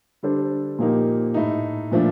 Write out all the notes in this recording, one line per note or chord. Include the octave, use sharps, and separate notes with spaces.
D3 G3 D4 A4 C5
A#2 F3 A#3 D#4 G4
A2 A3 D#4
A#2 F3 A3 D4